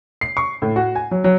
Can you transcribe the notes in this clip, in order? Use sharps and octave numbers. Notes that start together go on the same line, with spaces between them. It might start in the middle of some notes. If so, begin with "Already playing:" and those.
C7
C#6
A2
F#4
G#5
F#3
F#3